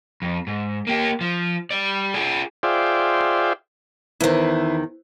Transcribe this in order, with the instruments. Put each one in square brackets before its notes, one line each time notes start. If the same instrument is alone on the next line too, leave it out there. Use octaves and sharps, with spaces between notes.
[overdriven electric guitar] F2
G#2
A#3 G4
F3
G3 D5
F4 G#4
[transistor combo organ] F4 G#4 C5 D5 E5 G5
[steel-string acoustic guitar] E2 D#3 [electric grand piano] E4 B4 C5